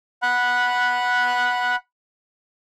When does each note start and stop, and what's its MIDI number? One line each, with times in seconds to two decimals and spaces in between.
0.22 1.76 78
0.22 1.76 83
0.22 1.76 90